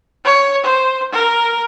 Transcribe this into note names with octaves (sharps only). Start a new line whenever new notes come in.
C#5
C5
A#4